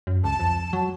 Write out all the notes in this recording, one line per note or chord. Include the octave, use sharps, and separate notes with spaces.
F#2
C#2 A5
F2
F#3